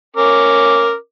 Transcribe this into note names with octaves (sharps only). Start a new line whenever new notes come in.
C#4 A#4 D6